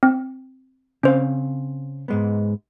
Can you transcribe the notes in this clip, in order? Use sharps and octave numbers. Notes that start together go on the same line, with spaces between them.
C4
C#3 C4 C#4 C5 F5
G#2 G#3 B3